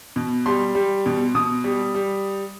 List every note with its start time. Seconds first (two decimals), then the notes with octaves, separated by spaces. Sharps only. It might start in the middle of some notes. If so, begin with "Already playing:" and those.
0.16 B2
0.46 G3 C6
0.75 G3
1.06 B2
1.35 B2 D#6
1.64 G3
1.95 G3